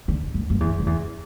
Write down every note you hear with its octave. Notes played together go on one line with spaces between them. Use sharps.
D3
F#2
F#2
E2
F#2
E2